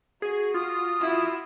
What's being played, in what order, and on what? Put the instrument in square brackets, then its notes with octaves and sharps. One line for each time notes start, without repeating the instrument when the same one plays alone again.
[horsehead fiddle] F#4 [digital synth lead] G#4
[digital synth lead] F4 [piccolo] D#6
[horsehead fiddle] E4 F#4